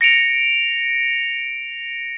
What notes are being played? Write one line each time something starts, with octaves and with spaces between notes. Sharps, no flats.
A#6 C#7 D7 F7